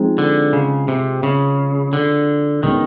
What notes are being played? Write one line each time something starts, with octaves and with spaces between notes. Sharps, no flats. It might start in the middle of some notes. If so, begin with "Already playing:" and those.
Already playing: F3 G#3 C4 D#4
D3
C#3
C3
C#3
D3
B2 D#3 G#3 C#4